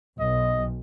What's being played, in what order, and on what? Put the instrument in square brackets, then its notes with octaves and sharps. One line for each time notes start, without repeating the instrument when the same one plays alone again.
[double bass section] B1 [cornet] D#5